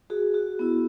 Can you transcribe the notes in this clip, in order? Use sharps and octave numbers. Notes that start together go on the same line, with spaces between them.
F#4 G#4
F#4
B3 E4